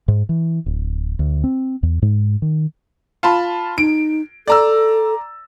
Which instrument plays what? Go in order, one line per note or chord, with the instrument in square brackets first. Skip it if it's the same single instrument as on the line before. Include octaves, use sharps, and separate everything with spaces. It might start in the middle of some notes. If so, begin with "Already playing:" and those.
[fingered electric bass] G#2
E3
D1
D2
C4
E2
G#2
D#3
[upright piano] F4 A5 B5
[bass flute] D#4 [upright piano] D7
[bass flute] A4 [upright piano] D5 A#5 E6